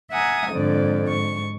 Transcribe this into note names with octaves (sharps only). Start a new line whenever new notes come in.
E5 F#5 G#5 A#5 D#6
F2 G#2 D3 D5
G#2 C#6